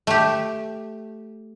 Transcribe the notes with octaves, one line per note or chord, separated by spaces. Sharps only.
A3 G4